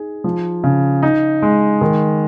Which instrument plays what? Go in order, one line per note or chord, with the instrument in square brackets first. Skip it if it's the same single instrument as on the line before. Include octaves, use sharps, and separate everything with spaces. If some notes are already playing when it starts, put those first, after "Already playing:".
Already playing: [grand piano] D#4 G#4
F3
C#3
D#4
G#3
D#3